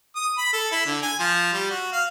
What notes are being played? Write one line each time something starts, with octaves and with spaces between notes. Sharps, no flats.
D#6
B5
A4
E4
D3
G#5
F3
G3
F#4
F5